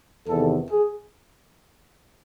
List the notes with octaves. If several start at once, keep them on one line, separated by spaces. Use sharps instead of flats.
E2 C3 D#3 A4
G#4